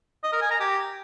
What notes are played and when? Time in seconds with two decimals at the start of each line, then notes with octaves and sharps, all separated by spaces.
0.23 D#5
0.32 A#4
0.42 G#5
0.51 A#5
0.60 G4